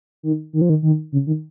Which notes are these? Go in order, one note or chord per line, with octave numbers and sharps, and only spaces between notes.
D#3
D#3
F3
D#3
D#3
C#3
D#3